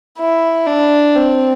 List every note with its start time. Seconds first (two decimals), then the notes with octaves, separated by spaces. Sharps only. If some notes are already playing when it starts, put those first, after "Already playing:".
0.19 E4
0.67 D4
1.16 C4